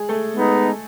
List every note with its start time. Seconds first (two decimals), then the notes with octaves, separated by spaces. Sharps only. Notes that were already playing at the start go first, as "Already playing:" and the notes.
Already playing: G#3 G#4
0.09 A3 A4
0.33 G#3 B3 D#4